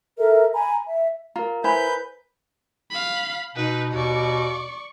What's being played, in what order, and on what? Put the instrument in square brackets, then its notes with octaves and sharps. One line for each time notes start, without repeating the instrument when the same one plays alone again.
[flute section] A4 A#4 E5
G#5 A#5 B5
E5
[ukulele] F4 [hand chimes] A#4 A#5
[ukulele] E4 [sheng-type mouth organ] B4 G6 [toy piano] C5 G#5 B5
[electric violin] F5 B5
[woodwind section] B2 [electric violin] D#4 B4
[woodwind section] D#2 B2 [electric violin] D5 C#6